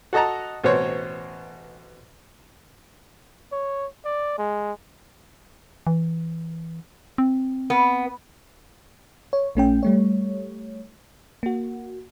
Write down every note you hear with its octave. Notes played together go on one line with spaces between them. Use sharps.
F#4 A4 D#5 A5 A#5
A1 B2 C4 C5 C#5
C#5
D5
G#3
E3
C4
B3
C#5
A#1 A3 C#4 G5
G3 A3 C#5
A#3 F#4